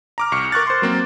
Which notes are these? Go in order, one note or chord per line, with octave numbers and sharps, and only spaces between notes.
A#5 D6 F6
C2 C#6 C#7
A#4 C#6 F#6 A6
C5 C6
F#3 A#3 C4